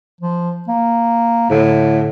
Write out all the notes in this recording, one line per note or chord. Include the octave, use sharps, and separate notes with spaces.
F3
A#3
A2 D3